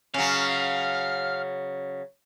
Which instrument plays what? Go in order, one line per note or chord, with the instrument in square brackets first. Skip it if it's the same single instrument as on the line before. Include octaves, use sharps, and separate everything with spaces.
[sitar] C#3 F#3 [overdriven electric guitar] F5